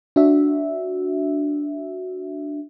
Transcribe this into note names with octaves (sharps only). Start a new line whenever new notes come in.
D4 F#4 E5